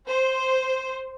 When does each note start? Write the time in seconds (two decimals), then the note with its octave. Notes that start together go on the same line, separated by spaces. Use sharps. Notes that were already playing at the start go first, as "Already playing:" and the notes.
0.08 C5